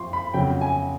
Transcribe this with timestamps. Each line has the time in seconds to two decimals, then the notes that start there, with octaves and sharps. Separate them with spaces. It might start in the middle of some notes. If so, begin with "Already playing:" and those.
Already playing: F2 F3 C6 C#6
0.13 B5
0.34 F2 C#3 F#3 G5
0.61 G#5